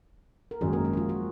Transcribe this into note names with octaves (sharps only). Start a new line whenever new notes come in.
A#4
G#1 F#2 D#3 F#3 G#3 G#4
A#3 A#4
G#3 G#4
F#4
F3 F4
F#3 F#4